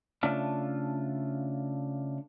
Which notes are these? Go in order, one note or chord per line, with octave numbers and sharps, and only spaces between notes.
C#3 A3 D4 F4